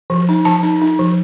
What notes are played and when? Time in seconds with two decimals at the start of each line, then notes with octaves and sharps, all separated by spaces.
0.10 F3
0.29 D#4
0.45 F3 A5
0.63 D#4
0.82 D#4
0.99 F3